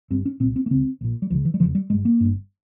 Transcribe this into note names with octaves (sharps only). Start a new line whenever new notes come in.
G1 G2 C4
C#4
C2 A#2 C4
C4
A#3
C#2 C#3 C4
A#1 A#2
G3
C#2 C#3 F3
E3
G3
F1 E2 C#3 F3
G3
G1 G2 G#3
A#3
G1 G2